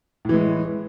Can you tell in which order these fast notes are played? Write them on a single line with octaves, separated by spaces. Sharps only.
A2 E3 G#3